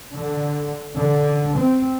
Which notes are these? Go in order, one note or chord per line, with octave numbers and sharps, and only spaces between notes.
D3
D3
C4